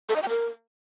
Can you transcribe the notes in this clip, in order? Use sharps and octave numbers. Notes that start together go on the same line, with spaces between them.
A4
D#5
G5
A#4